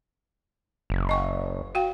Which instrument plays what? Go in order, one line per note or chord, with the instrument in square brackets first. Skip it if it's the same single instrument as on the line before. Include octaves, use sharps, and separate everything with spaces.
[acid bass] F#1
[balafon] D#5 C#6
F#4 F5 G5